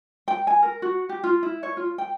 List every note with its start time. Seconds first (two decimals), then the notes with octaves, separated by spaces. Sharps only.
0.28 G5
0.47 G#5
0.62 A#4
0.82 F#4
1.09 G4
1.24 F4
1.43 E4
1.63 C#5
1.77 F4
1.98 G5